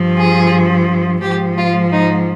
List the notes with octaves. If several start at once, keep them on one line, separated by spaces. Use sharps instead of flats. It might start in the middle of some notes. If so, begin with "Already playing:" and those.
Already playing: G2 F3
G#4
G#2 F3 G4
F4
D#4